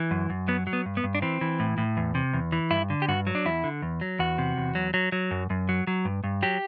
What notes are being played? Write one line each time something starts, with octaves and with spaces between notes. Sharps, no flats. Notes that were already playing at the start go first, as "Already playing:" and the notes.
Already playing: E3
F#2
F#2
F#3 B3
F#3
B3
G2
B3
G2
D4
E3 C4
E3
A2
A2
E2
C3
E2
E3
G2 E4
D3
G4
G2 F#4
F#3
D4
E2 E4
D3
E2
F#3
E2 F#4
C3
E2
F#3
F#3
F#3
F#2
F#2
F#3
F#3
G2
G2
F#3 G4